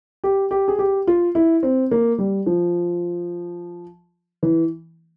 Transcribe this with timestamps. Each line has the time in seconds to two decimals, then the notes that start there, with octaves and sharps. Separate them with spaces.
0.24 G4
0.51 G4
0.68 G#4
0.79 G4
1.07 F4
1.35 E4
1.63 C4
1.91 A#3
2.18 G3
2.46 F3
4.43 E3